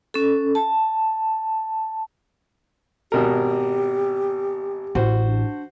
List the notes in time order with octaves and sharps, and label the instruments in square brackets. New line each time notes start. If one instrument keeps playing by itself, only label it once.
[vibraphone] C#4 A4
A5
[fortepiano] G#1 B2 A#4 [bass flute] G4
[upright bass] A1 [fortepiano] F#4 C5
[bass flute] D4